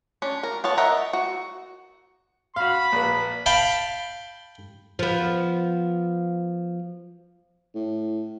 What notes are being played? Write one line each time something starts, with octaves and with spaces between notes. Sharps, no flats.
C#4 D4
A#4
B3 C#5 A5
A#4 C#5 D#5 E5 F#5
F#4
F#4 F5 B5
A#1 B4
F5 G5 A5 B5
F3 B3
A2